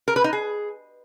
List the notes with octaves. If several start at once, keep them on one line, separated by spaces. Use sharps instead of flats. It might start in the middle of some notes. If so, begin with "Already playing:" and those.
A#4
B4
D#4
G#4